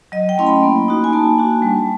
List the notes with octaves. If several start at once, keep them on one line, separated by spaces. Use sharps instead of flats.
F#3 D#5
G5
A3 C#4 E4 C6
B5
A#3
D#4 F#4
G#5
A#3 A5
D4 F#4
G3